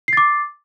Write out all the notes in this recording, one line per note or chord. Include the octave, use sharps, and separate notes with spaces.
D6 A6 C7